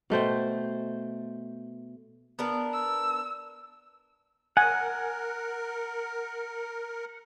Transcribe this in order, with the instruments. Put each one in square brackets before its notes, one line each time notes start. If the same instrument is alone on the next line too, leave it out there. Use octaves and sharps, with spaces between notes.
[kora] B2 A3 C5 G5
[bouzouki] B3 D4 A#4
[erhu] E6
[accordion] A#4 [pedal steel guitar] F#5 [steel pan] G#5